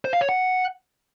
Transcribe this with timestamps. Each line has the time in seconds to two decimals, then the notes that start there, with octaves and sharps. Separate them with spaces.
0.05 C5
0.13 F5
0.21 C#5
0.29 F#5